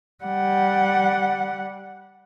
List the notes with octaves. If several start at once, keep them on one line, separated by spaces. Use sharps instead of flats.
G3 F#5